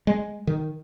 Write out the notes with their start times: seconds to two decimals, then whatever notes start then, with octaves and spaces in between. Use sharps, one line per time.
0.07 G#3
0.47 D#3